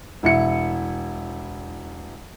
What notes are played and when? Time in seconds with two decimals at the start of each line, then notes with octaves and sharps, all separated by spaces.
0.23 E1 E4 C#7